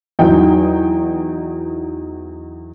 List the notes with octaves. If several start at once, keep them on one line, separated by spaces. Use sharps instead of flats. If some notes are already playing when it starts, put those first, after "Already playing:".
E2 D#3 F#3 D#4 G5